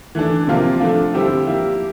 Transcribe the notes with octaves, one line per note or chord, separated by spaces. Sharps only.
E3 A3 D4
C3 F3 A#3 F4
F3 A3 D4 F4
D3 G3 C4 E4 G4
F3 A#3 E4 G4